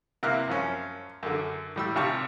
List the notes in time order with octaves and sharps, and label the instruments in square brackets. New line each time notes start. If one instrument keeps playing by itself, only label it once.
[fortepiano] C3 A#3 E4 F6 F#6
F#2 F3 C#4
F#2 D3
A2 G3 E6
G#1 C3 F4 G4 A5 C#6